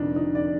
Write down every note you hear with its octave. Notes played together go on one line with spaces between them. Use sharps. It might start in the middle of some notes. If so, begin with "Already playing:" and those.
Already playing: F1 F2 D3 D4 D#4
D#4
D5